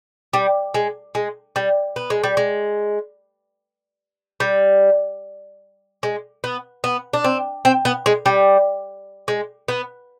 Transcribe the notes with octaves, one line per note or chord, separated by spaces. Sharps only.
G3
G#3
G#3
G3
B3
G#3
G3
G#3
G3
G#3
B3
B3
D4
C4
C4
B3
G#3
G3
G#3
B3